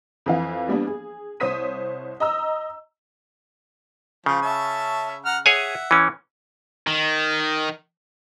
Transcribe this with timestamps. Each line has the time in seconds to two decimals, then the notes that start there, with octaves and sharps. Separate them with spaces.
0.26 F2 E3 F5
0.68 G3 A#3 B3 D4
0.87 G#4
1.40 C2 C5 C#5 D#6 B6 D#7
2.20 D#5 A#5 E6
4.26 C#3 F3
4.42 C#4 E5 A5
5.25 F#5 A#5 F6
5.46 G#4 C#5 E5 F#5 G#5
5.91 E3 C#4
6.87 D#3